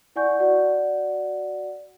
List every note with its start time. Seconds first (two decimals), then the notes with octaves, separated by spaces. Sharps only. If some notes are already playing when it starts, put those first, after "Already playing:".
0.16 E4 D5 F#5 G#5 C#6 G6
0.40 F#4 D5 F#5